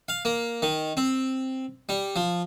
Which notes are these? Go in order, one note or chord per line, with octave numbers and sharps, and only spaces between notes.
F5
A#3
D#3
C4
G3
F3